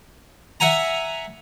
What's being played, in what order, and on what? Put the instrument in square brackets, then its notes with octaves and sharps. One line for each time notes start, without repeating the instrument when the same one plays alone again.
[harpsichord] E5 F#5 G#5 A#5